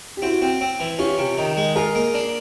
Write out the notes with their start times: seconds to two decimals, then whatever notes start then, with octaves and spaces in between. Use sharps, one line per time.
0.17 G4
0.22 C4 E4 F#4
0.42 C4
0.61 C4
0.80 E3
0.98 C#4 F4 G4
1.18 C3
1.38 D#3
1.57 G#3
1.75 F4 G#4 A#4
1.95 A#3
2.14 D4